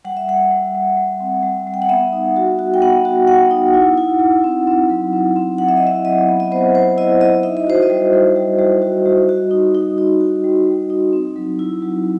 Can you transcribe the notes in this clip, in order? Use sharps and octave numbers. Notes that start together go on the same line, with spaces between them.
G3 F#5
E5
G3 F#5
G3
G3
G3
C4
G3
G3
G5
F#5
B3 E5
D#4
F#4
F#4
G5
B3 F#5
F#4
B3 F#5
D#4
E4
E4
E4
C4
C4
F#3
C4
C4
F#3 F#5
E5
D#5
E4 E5
F#3 D#5
B3
D#5
B3 C5
F#3 C5
E4 D#5
E4 D#5
D#4 E5
D#5
F#4 C5
D#5
G3
G3
G3
G3
F#4
G3
F#4
D#4
D#4
D#4
F#4
G3
G3
D#4
C4
F#3
E4
F#3